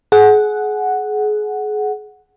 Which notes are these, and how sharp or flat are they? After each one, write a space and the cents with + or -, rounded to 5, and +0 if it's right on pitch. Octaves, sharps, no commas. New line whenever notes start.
G#4 +30 F#5 +0